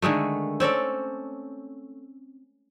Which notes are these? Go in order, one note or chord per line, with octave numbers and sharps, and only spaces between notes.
D3 D#3 G#3 A3
C4 C#4 A4 D5